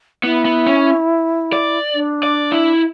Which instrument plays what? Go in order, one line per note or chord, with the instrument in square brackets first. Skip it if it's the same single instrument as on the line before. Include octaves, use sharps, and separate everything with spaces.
[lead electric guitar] B3 [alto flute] E4
[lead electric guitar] B3
C#4
D5
[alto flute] D4
[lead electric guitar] D5
E4